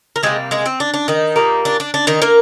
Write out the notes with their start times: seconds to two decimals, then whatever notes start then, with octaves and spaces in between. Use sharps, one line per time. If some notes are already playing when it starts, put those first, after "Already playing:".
0.16 A#4
0.23 C3 G3 G#3 A#3 G#4
0.51 G#3 G#4
0.66 C4
0.80 D4
0.94 D4
1.08 D#3 D#4
1.36 A#2 G3 A#3
1.65 D4
1.80 D4
1.94 D4
2.07 D#3 D#4
2.22 A#3 A#4